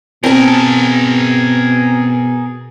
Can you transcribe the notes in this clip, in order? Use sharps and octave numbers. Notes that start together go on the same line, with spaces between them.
B2 C4 G#4 A#4 A5